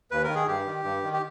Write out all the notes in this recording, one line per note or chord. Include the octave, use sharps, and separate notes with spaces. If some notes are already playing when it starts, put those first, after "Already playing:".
D#2 B4
D#3 A#4
G#4
G2 G4
D#3
G2
D#3
G4